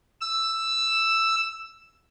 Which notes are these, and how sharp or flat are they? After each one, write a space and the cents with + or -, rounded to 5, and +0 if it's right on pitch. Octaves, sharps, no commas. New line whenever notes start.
E6 +5